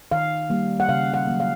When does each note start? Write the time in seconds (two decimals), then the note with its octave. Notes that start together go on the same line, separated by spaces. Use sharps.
0.11 D#3 F5
0.50 G3 A#3
0.80 F#5
0.89 C#3 F5
1.14 F#5
1.27 F#3 A#3
1.40 F5